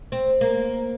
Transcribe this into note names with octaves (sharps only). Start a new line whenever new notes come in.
C4
A#3